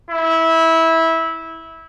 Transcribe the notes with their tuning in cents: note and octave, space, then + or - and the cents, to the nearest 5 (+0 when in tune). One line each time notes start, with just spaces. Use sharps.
E4 -15